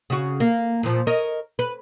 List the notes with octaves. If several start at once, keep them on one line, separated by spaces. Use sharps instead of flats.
C#3 F#4
A#3
A#2 F3
A#4 C#5 D#5
B4